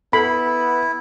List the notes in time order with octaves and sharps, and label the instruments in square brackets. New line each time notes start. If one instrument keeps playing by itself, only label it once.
[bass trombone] B3 [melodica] E4 [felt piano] A4 [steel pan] B5